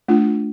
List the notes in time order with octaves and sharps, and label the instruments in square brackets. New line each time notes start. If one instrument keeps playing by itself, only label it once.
[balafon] A3 D4 F4